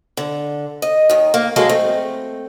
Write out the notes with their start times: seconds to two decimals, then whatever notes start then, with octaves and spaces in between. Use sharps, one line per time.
0.17 D3
0.82 D#5
1.10 D#2 D#3
1.34 A#3
1.56 F#3 G#3 A#3 G#4 A4
1.69 A3 C4